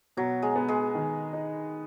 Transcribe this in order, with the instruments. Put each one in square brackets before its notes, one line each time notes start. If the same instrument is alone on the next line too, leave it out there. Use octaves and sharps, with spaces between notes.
[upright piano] B2 [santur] F#3
[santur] G#3
[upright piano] B3
[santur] G#3
[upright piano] D#3
D#4